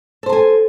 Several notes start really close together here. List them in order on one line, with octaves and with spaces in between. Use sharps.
A4 C5 A5 G#5